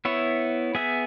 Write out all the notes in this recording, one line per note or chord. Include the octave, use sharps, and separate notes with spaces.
B3 E4 C#5 E5
B3 G#4 E5